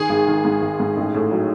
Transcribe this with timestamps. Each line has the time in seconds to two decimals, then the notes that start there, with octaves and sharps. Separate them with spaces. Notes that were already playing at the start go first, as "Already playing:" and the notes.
Already playing: D#3 G#4
0.10 G#1
0.28 D#3
0.45 G#2
0.62 G#1
0.80 G#2
0.97 A1
1.14 A2
1.32 F#3